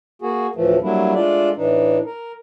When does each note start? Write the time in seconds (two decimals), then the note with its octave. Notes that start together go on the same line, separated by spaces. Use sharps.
0.22 A#3 F#4 G#4
0.55 D2 A2 E3 F3 A3
0.82 F#3 G3 A3 A#3 D4 E4
1.14 G#3 A3 D4 F4 D5
1.56 A2 E3 D4 D#4
2.05 A#4